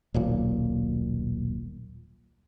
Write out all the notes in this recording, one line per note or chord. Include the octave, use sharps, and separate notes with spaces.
D#1 B1 A#2